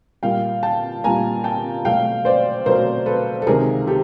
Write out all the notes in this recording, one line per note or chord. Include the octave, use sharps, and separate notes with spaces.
A#2 G3 A#3 F5 G5
G5 A5
A#2 G3 A#3 G#5 A#5
G5 A5
B2 F#3 A3 F5 G5
C5 D5
B2 F#3 A3 A#4 C5
A4 B4
A4
C#2 C3 D#3 F#3 G#4 A#4
G4 A4